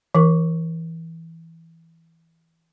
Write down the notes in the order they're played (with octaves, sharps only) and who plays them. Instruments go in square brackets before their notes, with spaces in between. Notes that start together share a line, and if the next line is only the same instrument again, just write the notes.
[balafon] E3 A#4 C#6